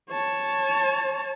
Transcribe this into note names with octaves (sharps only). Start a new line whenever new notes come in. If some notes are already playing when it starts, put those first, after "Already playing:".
C#5 A5